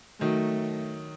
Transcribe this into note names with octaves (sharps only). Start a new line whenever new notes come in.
D#3 F#3 A3